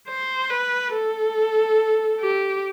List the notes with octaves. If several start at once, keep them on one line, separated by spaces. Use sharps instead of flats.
C5
B4
A4
G4